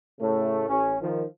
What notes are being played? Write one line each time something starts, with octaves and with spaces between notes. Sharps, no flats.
A2 C#3 A3
A1 C#4
D#3 F3